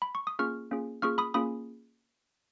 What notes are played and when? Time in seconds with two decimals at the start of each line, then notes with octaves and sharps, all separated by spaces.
0.02 B5
0.15 C#6
0.27 D#6
0.39 A#3 C#4 F4 G#4 C#6 F6
0.71 A#3 C#4 F4 G#4
1.02 A#3 C#4 F4 G#4 C#6 F6
1.18 B5 D#6
1.34 A#3 C#4 F4 G#4 B5 D#6